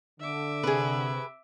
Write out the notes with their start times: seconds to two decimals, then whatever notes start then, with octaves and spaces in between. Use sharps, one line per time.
0.20 D3 E5 D6
0.63 C3 G#4 B4